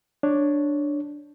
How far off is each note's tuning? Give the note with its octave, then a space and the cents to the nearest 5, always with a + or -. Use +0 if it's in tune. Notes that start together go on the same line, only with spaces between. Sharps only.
D4 +0 C#5 +0